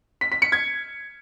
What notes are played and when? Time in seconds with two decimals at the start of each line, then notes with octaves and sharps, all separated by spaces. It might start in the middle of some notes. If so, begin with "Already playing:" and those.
0.21 B6
0.32 B6
0.42 C#7
0.52 G#6